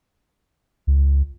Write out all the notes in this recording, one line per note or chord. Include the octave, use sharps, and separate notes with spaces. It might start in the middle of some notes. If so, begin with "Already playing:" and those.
C#2